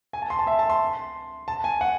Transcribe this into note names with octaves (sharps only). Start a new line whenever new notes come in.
G#5
A5
C6
A5
E5
A5
C6
A5
G#5
F#5